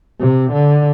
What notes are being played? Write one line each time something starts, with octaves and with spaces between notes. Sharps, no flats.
C3
D3